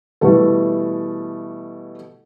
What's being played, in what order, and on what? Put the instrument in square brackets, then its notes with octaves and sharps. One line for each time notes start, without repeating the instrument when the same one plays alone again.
[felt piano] B2 E3 G3 A3 A4